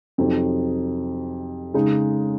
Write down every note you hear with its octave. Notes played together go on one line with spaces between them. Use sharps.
F2 C3 F#3 C4 D#4
C#3 G#3 D#4